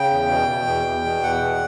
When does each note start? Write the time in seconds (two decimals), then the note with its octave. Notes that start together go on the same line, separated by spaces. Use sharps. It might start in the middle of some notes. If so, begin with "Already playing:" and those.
Already playing: C#3 G5
0.10 E2
0.29 B2
0.48 B2
0.67 E2
0.86 E2
1.05 B2
1.23 E2 F#5
1.41 B2